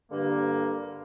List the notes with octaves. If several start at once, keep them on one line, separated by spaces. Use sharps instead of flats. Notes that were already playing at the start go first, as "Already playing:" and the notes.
G2 D3 A#3